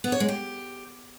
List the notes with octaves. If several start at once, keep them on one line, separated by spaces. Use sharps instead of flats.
B3
C#5
G#3
G4